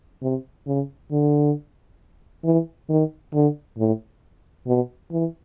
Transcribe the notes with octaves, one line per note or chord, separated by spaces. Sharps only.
C3
C#3
D3
E3
D#3
D3
A2
B2
E3